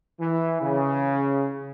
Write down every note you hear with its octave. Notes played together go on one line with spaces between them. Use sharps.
E3
C#3